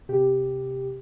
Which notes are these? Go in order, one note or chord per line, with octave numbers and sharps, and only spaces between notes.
C3 G4